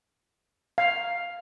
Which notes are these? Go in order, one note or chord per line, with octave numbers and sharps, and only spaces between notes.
F5